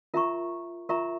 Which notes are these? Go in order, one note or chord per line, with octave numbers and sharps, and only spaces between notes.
F4 A#4 E5 A#5 C#6
F4 A#4 E5 A#5 C#6